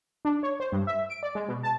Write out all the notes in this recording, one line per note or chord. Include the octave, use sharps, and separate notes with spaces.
D4
C#5
C5
G2
E5
D7
D5
G#3
B2
A5